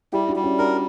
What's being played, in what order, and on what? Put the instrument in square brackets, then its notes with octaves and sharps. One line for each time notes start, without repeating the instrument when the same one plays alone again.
[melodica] G3 [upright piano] E4 G4
[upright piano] D4 F#4
[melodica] G3
[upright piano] C#4 E4
[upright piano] D4 F#4 [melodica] A#4